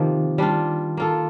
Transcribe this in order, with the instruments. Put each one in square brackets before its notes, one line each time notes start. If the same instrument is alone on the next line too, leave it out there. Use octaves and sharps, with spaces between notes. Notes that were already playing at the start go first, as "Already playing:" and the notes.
Already playing: [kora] C3 F3 A#3 [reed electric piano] D#3
[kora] G3 D4 F4
A#3 F4 A4